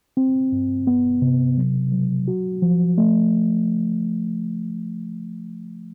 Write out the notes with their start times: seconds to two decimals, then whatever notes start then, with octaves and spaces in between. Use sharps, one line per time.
0.17 C4
0.52 G2
0.87 B3
1.22 C3
1.57 F#3
1.92 F#3
2.28 F#4
2.62 F3
2.98 A3